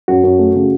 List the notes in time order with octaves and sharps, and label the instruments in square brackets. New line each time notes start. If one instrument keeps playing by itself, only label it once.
[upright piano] F#2 [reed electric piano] F#4
[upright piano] F#2
A3
C#3